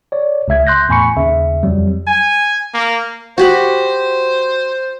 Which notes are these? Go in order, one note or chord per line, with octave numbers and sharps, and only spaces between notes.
C#5 D5
C#2 C#3 E5 G#6
C6 F#6 G6 A#6
E2 A2 G#5 B5 C#6 C#7
D#2 C#3 E5
F2 F#3 G3
G#5
A#3
F#4 G4 C5 B5